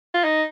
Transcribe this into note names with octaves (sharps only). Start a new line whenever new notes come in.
F4
D#4